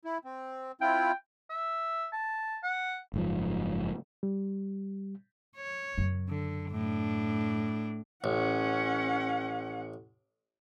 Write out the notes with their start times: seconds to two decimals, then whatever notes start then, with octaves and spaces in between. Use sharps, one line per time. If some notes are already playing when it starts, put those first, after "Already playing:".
0.05 E4
0.25 C4
0.81 C4 E4 F4 G5
1.50 E5
2.13 A5
2.63 F#5
3.14 F#1 G#2 F3
4.23 G3
5.57 C#5
5.98 F#2 C#3
6.29 D3
6.71 A2 D4
8.24 A1 C#4 F#5